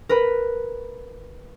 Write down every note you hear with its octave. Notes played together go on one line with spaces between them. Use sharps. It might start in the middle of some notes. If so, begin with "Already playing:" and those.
A#4 B4 B5